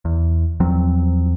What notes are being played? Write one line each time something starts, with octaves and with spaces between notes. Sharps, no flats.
E2
E2 F3 F#3 C4